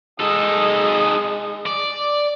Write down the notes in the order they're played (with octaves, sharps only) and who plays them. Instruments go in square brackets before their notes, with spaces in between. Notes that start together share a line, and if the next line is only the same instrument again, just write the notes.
[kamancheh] G#3 D#6 [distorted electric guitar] D#4 A4
[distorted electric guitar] D5